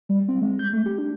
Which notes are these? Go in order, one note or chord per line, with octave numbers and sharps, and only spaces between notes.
G3
C4
G#3
G6
A3
G4
D4